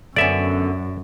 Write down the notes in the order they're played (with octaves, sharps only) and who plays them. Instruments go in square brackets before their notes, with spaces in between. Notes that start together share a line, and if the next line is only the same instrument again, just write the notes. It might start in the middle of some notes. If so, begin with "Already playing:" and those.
[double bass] F#2 [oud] D3 B3 C#4 [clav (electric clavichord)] D5 E5